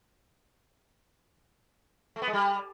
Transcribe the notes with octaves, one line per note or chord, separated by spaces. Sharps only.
A3
B3
G#3
G3